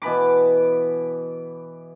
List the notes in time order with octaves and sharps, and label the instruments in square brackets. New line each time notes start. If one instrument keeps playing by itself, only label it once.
[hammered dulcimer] B2 E3 B5 D6